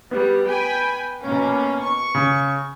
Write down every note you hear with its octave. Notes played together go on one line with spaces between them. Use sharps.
G3 B3
G5 G#5 B5
B2 A#3 C#4
C#6
C#3